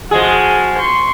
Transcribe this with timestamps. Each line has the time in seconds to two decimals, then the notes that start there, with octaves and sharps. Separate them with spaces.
0.11 F3 G#3 F#4 G#4
0.78 C6 C#6